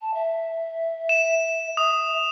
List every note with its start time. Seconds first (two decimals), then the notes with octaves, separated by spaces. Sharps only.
0.01 A5
0.14 E5
1.09 E7
1.77 E5 D#6